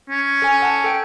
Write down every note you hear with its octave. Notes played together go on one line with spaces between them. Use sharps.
C#4
A4 G#5
F#5 A5
A4 G5 D7